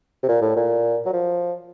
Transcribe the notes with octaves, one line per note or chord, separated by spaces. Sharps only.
C3
A#2
A2
A#2
F#3
F3